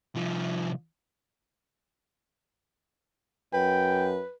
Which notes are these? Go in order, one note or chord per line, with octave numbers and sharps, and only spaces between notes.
C2 F3
F#2 B4 G5